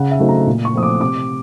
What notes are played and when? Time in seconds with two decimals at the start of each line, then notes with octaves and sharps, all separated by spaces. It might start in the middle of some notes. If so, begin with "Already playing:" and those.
Already playing: C#3 F#5
0.11 E5
0.19 F#3 A3 C4 D#4
0.29 A#5
0.47 A#2
0.65 C#6
0.74 F3 A3 C4 D#6
0.83 D6
1.00 C3 D6